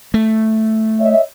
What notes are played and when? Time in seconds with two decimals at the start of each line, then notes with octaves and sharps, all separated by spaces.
0.14 A3
1.00 C#5 D#5 E5